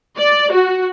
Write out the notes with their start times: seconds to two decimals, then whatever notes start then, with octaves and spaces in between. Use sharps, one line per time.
0.17 D5
0.53 F#4